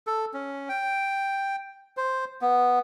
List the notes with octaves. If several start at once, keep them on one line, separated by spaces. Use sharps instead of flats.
A4
C#4
G5
C5
B3